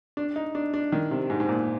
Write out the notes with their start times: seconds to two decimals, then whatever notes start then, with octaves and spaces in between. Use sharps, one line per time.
0.17 D4
0.36 D#4
0.55 D4
0.74 D4
0.92 D#3
1.11 C3
1.30 G#2
1.40 G#2
1.49 A#2